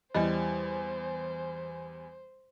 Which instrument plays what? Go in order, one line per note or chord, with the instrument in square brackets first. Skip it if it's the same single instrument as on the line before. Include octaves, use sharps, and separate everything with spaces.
[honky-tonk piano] E2 G3 [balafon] E4 D#5 [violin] C5